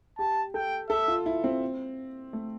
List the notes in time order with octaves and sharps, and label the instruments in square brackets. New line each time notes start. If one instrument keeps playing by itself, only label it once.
[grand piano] G4 [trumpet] A5
[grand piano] A4 [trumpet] G5
[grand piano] A4 [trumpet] E5
[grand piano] F4
E4
C4
A3